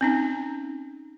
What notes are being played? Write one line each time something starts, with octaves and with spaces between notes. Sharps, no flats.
C4 C#4 D#4